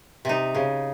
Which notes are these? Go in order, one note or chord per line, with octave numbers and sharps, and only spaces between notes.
C3 D#4
C#3